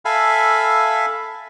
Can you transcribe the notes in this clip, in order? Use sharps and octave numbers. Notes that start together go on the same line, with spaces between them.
A4 E5 F5 G#5 B5